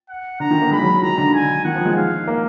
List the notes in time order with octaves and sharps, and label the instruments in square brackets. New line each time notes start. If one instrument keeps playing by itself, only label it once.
[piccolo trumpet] F#5
[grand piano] D3 [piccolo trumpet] A#5
[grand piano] D#3
A#3
[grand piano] G#3 [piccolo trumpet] B5
[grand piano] F#3
[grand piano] D#3 [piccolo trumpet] A#5
[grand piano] D3
[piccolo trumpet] G#5
[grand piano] D#3 [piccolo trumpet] F#5
[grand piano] F3
G#3
[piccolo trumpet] F5
[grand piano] A#3